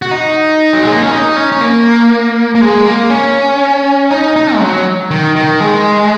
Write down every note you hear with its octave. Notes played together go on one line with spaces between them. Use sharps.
F#4
D#4
F#3
G#3
A#3
C#4
D#4
C#4
C#4
A#3
A#3
G#3
A#3
C#4
D#4
D#4
G#3
F#3
D#3
D#3
G#3